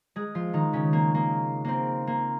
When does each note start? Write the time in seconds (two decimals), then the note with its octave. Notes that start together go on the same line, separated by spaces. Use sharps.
0.16 G#3 G#4
0.35 F3 F4
0.53 D#3 D#4
0.73 C#3 C#4
0.93 A#3
1.15 A#3
1.65 A#3 C4
2.07 A#3